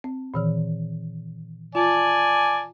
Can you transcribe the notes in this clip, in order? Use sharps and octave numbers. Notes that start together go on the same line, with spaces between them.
C4
A#2 D#3 E3
F4 D5 G#5 A5